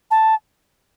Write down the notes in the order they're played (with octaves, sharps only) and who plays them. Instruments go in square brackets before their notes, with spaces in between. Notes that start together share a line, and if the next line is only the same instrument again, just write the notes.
[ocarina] A5